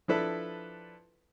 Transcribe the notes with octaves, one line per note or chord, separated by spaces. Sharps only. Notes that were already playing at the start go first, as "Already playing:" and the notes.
F3 D4 E4 A4 B4